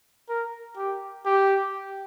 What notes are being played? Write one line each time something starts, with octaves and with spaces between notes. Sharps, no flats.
A#4
G4
G4